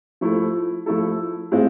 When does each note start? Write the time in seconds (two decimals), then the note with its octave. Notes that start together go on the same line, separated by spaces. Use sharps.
0.21 F3 A3 E4 A4
0.86 F3 A3 E4 A4
1.51 A2 G#3 C4 F4